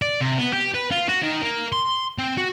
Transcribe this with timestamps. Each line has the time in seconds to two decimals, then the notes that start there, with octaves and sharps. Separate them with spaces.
0.02 D5
0.21 C3
0.38 B3
0.53 G4
0.75 B4
0.91 F4
1.09 F#4
1.22 D#3
1.42 A#3
1.72 C6
2.18 C4
2.37 F#4